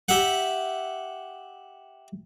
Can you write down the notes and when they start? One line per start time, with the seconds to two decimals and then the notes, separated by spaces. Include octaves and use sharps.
0.09 G4 E5 F#5